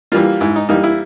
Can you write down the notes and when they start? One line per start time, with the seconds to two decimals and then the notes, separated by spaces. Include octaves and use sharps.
0.12 E3 G3 A#3 F4
0.41 G#2 E4
0.56 D#4
0.69 E3 G3 A#3 D#4
0.84 E4